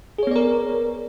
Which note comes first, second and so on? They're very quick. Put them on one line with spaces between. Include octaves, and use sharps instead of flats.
G#4 C#5 B3 D5 A#4